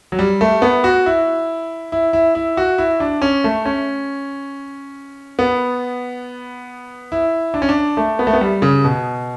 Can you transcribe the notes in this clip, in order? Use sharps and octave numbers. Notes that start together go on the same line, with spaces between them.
F#3
G3
A3
B3
F#4
E4
E4
E4
E4
F#4
E4
D4
C#4
A3
C#4
B3
E4
D4
C#4
D4
A3
B3
A3
B3
G3
C#3
B2